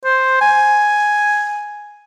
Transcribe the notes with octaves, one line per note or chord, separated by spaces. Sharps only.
C5
G#5